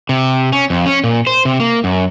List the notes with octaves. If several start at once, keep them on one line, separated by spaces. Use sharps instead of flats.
C3
C#4
F2
C#4
A#2
C5
C3
A#3
F#2